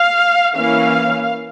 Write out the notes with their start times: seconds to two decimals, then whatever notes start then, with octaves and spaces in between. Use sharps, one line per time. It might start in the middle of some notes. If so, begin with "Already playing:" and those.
Already playing: F5
0.56 E3 A#3 C#4 F5